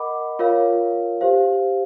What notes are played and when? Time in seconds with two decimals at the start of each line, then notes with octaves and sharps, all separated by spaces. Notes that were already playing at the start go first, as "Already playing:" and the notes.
Already playing: A#4 D#5 F#5 B5 D6
0.39 F4 A#4 C#5 F5
1.21 G4 C5 F5